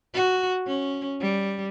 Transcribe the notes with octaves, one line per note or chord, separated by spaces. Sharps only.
F#4
C#4
G3